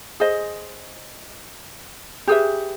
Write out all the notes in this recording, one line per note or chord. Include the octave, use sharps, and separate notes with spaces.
G#4 C5 D#5
G4 G#4 B4 E5